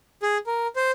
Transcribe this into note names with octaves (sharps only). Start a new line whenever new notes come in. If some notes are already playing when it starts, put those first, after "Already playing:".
G#4
A#4
C5